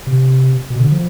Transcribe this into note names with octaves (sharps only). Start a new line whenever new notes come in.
C3
B2
D3
F3